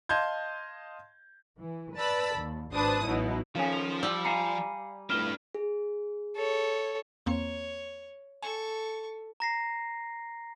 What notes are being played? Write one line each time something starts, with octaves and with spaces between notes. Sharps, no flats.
D#5 F5 A5 C6 G6 G#6
E3
B4 D5 A5 B5 E6
D#2
G#1 D4 B4 C5 A5 D#6
A1 B2 F#3 D#4 E4
D#3 F3 C#4 F5 G#5
F7
G3 E6
F5 G#5 A#5 C7 C#7
C2 A2 D4 B4 F6 E7 G7
G#4
A4 C#5
E2 A#3 C4 C#5
A4 G#5 C#6
A#5 A#6 C7